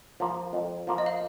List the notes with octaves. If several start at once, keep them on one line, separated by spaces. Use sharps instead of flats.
F3 A#3
F2
F3 A#3
D#5
F5